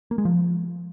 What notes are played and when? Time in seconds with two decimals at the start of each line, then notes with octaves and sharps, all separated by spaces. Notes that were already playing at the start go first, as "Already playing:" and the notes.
0.11 A#3
0.18 G#3
0.25 F3